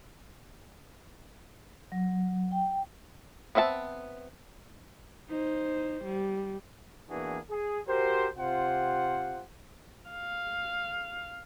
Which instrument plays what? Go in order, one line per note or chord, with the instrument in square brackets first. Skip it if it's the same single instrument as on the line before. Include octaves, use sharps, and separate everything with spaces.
[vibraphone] F#3
G5
[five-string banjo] B3 C4 E5 F5 A5
[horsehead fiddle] D#4 C5
G3
[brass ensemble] E2 E3 A#3 D4 F#4 G#4
G#4
F#4 G4 A#4 C5
C3 F4 G4 C5 F#5
[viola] F5